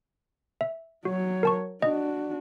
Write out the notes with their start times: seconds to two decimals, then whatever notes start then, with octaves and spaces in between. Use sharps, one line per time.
0.61 E5
1.05 F#3 F#4 C#5
1.43 A#4 A5 C#6
1.82 D4 F#4 D#5